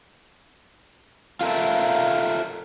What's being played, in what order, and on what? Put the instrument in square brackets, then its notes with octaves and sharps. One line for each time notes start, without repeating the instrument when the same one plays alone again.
[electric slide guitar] F4 A4 A#4 E5